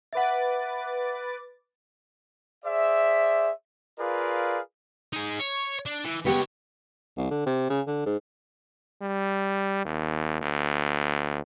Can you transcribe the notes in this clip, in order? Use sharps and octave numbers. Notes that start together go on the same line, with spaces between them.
B4 E5 F#5 D6 A6
G#4 C5 D5 E5
F4 G#4 A#4 B4 D5 F5
D#4 G#4
C#5
D4
E3
C#2 B3 G4 B4 C#5
C2
D3
C3
C#3
D3
G#2
G3
D#2
D2